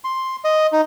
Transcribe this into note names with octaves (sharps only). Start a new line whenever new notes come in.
C6
D#5
D#4